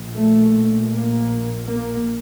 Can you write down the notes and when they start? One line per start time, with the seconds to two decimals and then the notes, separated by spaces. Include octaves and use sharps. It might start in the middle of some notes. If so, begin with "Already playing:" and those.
Already playing: A#1 A#2
0.14 A3
0.93 A#3
1.71 A#3